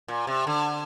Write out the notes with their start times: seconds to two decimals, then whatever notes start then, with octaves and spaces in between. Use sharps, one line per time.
0.08 A#2
0.27 C3
0.47 D3